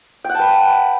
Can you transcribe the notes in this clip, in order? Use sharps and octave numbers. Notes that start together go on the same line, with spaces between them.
B4 F#5 G5 A5